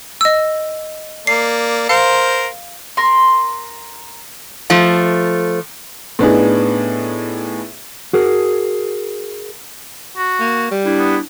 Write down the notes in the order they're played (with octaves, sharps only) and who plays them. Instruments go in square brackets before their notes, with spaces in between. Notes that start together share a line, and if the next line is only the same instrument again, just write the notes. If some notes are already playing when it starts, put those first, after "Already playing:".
[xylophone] D#5 E6
[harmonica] A#3 D5 [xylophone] C7
[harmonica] A#4 C5 [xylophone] F5
[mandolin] A#4 C6
[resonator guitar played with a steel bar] F3 A3
[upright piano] A2 B3 D4 D#4 G#4
[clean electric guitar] F#4 G#4 A#4
[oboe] F#4
[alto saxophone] A#3
G3
[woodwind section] D4 E4
[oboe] B3